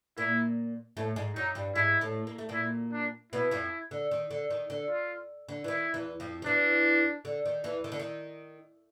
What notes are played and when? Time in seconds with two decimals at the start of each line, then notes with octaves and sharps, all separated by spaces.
0.17 A#2 A#3 E4
0.97 A2 A3
1.16 G#2 G#3
1.36 F#2 F#3 D#4
1.55 G2 G3
1.75 G#2 G#3 E4
2.01 A2 A3
2.27 A#3
2.38 A3
2.49 A#2 A#3 E4
2.93 D4
3.32 B2 B3 E4
3.51 F2 F3
3.91 D3
4.11 D#3
4.31 D3
4.50 D#3
4.70 D3
4.90 F4
5.48 D3
5.64 E3
5.68 D#3 E4
5.94 E2 E3
6.20 F2 F3
6.42 F3
6.46 E2 E3 D4
7.25 D3
7.46 D#3
7.64 E2 E3
7.84 D#3
7.92 D3
7.99 D#3